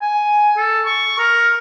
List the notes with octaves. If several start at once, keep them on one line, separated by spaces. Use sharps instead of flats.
G#5
A4
C#6
A#4